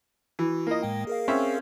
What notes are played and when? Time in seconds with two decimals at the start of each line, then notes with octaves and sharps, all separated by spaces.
0.39 E3 F#4
0.67 A#3 E4 F4 D#5
0.83 A2 G#3 G5
1.07 G#4 A#4 F5
1.28 C4 C#4 E5